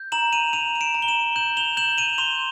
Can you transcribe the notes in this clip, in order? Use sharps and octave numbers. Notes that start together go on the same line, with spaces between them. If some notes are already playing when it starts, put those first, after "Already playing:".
Already playing: G6
A#5 E7 F#7
D#7 F7
A#5 D#7 F7
D#7
D7 E7
A#5
G7
E7 F#7
G6 E7 F#7
F7 G7
G6 E7 F#7
D#7 F7
C6 F7 G7